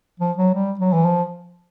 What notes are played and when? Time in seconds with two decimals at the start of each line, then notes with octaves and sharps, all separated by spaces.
0.20 F3
0.37 F#3
0.54 G3
0.79 F#3
0.93 E3
1.05 F3